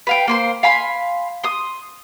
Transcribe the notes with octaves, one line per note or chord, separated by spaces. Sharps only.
B4 F5 G5
A#3 C5 C6
F5 G#5 B5 C6
C6 D#6